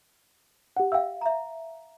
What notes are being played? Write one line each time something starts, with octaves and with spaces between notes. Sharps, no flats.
G4 F#5
E5 F5 G5 E6
E5 A#5